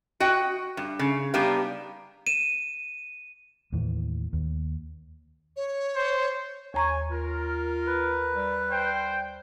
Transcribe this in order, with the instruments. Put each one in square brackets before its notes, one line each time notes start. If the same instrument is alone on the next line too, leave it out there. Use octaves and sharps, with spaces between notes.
[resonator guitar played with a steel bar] F#4 D#5 G5
G2
C#3
G3 B3 D4 D#4 G4 F5
[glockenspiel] D#7 E7
[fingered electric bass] D#2 A2 E3
D#2
[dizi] C#5
[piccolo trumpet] C5
[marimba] D#2 A#5 C#6 [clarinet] C#5 [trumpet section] G#5
[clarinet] F4 [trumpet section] A#4
[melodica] B4
[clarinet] G3
[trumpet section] C5 G5